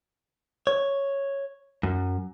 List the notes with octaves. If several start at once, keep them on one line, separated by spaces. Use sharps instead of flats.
C#5
F#2